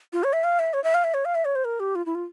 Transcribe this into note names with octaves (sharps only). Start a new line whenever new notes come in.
F4
C#5
E5
F5
E5
C#5
E5
F5
E5
C#5
F5
E5
C#5
C5
A#4
G4
F4
E4
F4